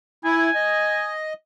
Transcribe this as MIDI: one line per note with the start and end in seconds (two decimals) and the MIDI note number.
0.25 0.50 64
0.25 1.12 80
0.55 1.33 75